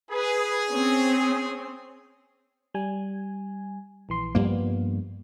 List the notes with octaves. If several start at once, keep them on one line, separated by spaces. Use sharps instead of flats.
G#4 B4
C4 C#4
G3 G#5
A#1 E3 C6
G2 F3 G3 A#3 B3